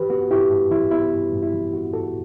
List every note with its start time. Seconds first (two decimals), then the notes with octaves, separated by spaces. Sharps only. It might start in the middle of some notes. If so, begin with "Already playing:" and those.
Already playing: E3 G4 B4
0.10 B3 F#4
0.31 G2 E4 G4
0.51 G2
0.71 E3 E4
0.91 B3 E4
1.13 G2
1.32 G2
1.43 E4
1.53 E3
1.73 B3 F#4
1.93 G2 F#4 A4